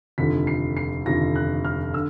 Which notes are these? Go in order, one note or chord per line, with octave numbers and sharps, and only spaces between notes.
F1 D#2 D3 F3 B6
C7
C7
F1 D#2 D3 F3 A#6
F#6
F6
D3 E6